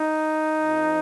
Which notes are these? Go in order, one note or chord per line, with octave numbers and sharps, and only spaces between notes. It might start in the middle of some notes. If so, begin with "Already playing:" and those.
Already playing: D#4
F2 F3